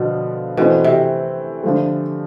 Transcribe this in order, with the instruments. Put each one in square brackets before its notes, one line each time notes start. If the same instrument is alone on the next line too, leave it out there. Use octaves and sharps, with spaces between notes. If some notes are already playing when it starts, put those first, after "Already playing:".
Already playing: [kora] B2 [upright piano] D3 F3 B3
[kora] B2 [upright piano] E3 A3 C4
[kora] C3
[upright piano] D3 F3 A3